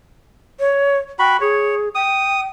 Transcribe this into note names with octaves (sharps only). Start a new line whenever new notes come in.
C#5
F#4 G5 B5
G#4 C#5
G5 D#6